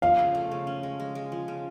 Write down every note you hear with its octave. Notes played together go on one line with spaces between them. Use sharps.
F3 F5
C#3
A3
C#3
C#4
G#3
G#3
G#3
F3
C#3